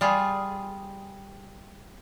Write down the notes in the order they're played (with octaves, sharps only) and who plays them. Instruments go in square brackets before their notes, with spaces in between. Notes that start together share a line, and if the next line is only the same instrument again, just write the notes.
[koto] G3 F4 G#4